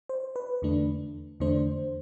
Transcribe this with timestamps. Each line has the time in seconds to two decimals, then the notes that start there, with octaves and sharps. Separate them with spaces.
0.09 C5
0.36 B4
0.62 E2 D3 A3 D4
1.40 E2 D3 A3 D4 C5